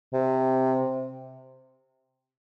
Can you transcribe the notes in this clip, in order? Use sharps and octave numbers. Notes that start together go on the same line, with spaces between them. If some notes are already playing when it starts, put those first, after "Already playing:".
C3